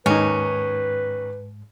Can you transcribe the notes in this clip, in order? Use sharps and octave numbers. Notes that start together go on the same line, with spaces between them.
D#2 G#2 C#4 D#4 B4